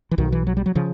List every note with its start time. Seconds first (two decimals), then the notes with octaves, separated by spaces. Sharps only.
0.11 E3
0.18 B1 B2 D#3
0.32 E3
0.47 F#3
0.57 G3
0.66 F#3
0.75 C#3 F3